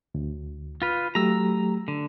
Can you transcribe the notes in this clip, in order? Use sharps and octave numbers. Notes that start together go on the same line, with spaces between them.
D2
F4 B4 F6
F#3 A3 G4 A#5 E6
D3